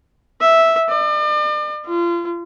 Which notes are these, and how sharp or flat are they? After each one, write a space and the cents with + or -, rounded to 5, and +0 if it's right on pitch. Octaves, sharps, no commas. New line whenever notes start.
E5 -5
D5 +40
F4 -30